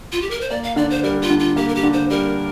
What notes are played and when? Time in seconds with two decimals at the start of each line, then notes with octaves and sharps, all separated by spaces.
0.12 F4
0.22 G4
0.31 A#4
0.41 C5
0.50 A#3 D5
0.63 F5
0.76 D3 D5
0.90 C5
1.03 G3 A#4
1.22 F4
1.30 D3
1.40 F4
1.56 A#3 G4
1.68 A#4
1.75 G4
1.83 D3
1.93 C5
2.10 G3 A#4